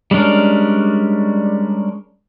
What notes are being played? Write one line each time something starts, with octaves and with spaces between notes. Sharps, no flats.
G3 G#3 C#4 D4 A#4